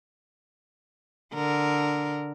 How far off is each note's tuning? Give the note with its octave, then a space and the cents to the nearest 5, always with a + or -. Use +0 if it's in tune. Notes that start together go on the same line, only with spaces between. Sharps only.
D3 +0 A#4 -5